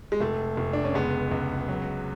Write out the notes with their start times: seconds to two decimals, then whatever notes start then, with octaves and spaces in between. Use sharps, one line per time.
0.12 G#3
0.21 F1 A3
0.57 F1
0.73 D4
0.84 C#4
0.94 C#2 G#3 B3
1.31 C#2
1.68 F#3